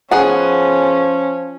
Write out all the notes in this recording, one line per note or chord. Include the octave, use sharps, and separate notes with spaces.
F3 B3 C#4 G#4 F#5